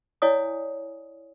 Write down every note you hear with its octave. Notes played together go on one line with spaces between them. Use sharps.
E4 C#5 D5 F5 G#5 D#6